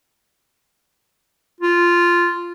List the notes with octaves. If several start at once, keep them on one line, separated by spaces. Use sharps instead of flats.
F4